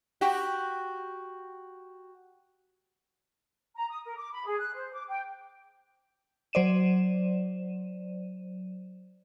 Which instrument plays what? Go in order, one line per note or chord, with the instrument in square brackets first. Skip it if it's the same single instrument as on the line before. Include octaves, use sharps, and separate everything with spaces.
[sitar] F#4 G4
[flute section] A#5
D#6
A#4
D6
B5
G#4
F#6
C5
D6
G5
[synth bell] F#3 C5 D5 D#7 E7